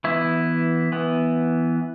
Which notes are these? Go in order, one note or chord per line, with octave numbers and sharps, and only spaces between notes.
E3 B3 E4
E3 B3